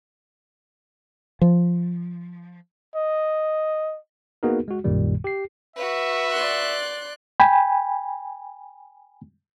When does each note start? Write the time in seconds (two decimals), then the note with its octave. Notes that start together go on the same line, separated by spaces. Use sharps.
1.42 F3
2.96 D#5
4.43 A#3 B3 D#4 F#4 G#4 A#4
4.68 G#3 F#4
4.84 B1 F#2 A#2 D#3 G3
5.24 G4 C7
5.76 F#4 B4 E5
6.32 D5 C6 F#6
7.40 G5 G#5 B5